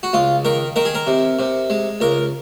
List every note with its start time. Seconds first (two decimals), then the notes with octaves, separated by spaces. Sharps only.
0.03 F#4
0.13 C#2 F4
0.45 D#3 A#4
0.76 D#3 A#4
0.85 G#4
0.95 A#4
1.07 C3
1.39 C3
1.70 G#3
2.00 C#2 A#4